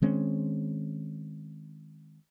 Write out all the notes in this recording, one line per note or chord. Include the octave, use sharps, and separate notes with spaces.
D#3 G#3 C4 C#4